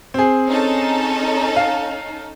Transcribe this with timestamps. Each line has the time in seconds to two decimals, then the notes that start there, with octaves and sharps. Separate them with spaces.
0.14 C4 G#4
0.48 C#4 D#4 A4
1.56 F5